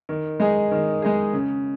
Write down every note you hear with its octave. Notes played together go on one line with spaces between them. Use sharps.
D#3
G#3 D#4 G#4
D#3
G#3 D#4 G#4
C#3